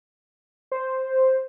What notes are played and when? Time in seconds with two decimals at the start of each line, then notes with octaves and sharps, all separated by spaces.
0.72 C5